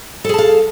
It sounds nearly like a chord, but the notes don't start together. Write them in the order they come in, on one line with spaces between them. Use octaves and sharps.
A4 G#4 A5 F5